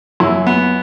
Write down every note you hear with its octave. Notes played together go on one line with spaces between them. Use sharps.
F#2 E4
B3